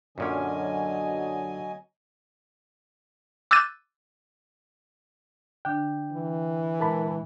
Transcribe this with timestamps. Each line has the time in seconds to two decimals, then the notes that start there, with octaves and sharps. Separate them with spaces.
0.18 F#2 A#2 D3 F#3 C#4 D#5 G#5
3.51 D6 E6 F#6 G6 A6 D#7
5.65 D3 D4 G5
6.12 E3
6.80 A#2 G#3 A#4 A5 B5